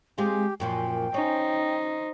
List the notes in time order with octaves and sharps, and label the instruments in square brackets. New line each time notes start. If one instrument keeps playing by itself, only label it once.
[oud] G#3 C4 F4 [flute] G4
[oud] F#2 A#2 F3 [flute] G5
[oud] C#4 [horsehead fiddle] D#4 C5